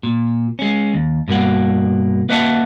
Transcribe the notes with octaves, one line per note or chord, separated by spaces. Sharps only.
A#2
G#3 C#4
D#2
G2 B2 A#3 F#5
A#3 B4 D#5 E5 F#5 A5